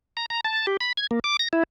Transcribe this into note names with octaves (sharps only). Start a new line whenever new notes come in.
A#5
A#5
A5
G4
B5
G#6
A#3
D6
A#6
E4